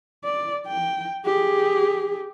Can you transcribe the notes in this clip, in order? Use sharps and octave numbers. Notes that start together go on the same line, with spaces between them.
D5
G5
G4 G#4